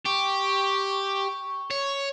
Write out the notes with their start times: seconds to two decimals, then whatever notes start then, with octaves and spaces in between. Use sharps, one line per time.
0.05 G4 C#6
1.70 C#5